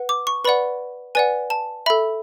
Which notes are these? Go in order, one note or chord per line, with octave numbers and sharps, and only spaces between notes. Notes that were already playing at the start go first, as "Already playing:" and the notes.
Already playing: B4 F#5
D6
C#6
B4 D5 F#5 B5
B4 D5 F#5 G#5
A5
A4 E5 B5